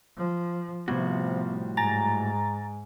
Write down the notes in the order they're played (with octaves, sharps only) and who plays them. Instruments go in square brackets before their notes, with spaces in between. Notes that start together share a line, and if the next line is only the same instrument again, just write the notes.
[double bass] F3
[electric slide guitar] A2 G3 F#4 [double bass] C3 F3 [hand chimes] B3
[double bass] G#2 [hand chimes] G#5 [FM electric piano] A#5 A6